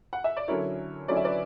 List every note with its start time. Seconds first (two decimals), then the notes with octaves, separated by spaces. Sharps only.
0.13 F#5
0.24 E5
0.37 D5
0.48 D3 F#3 C#4 E4 A#4 C#5
1.08 D3 F#3 C#4 E4 D5
1.17 E5
1.25 B4 D5